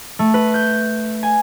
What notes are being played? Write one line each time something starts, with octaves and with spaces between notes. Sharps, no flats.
A3
B4
G6
G#5